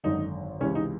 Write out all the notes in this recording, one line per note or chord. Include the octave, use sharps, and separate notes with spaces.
G#1 F#2 D3 D#4
C#2 C3 E3 C#4
D#4